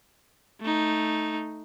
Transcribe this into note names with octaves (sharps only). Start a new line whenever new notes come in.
A3 D#4